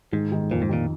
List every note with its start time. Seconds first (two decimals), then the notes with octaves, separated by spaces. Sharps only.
0.12 G#2 D#3
0.32 D#3
0.51 F2 A#2
0.62 G#2
0.69 A#2 D#3